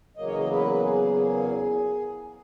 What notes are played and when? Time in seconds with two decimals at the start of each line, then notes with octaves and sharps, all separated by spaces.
0.17 E2 C#3 F#3 A#3 D#5
0.26 C#5
0.34 D#5
0.51 B4
0.83 G#4